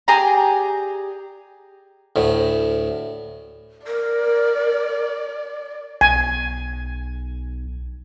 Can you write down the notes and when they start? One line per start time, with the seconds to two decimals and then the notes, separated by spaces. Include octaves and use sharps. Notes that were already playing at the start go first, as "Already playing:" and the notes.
0.08 G4 G#4 D5 A#5
2.16 D2 A2
3.87 A#4 D5
6.01 B1 G#5